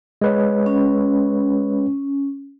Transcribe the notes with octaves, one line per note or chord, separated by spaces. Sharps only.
G#3 B4 C#5
C#4